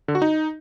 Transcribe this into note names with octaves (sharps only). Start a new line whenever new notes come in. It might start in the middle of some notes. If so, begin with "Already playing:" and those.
D3
F#4
D#4